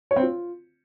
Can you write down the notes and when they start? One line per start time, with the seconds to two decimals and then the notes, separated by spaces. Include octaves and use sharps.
0.11 C#5
0.16 C4
0.22 F4